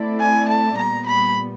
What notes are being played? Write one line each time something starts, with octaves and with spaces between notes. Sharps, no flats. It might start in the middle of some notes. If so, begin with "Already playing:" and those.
Already playing: A3 C4 E4 A4 D5
G#5
A5
A#2 G3 B3 A#5
B5